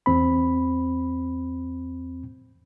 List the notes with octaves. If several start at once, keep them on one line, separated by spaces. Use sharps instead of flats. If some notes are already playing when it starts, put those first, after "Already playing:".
E2 C4 B5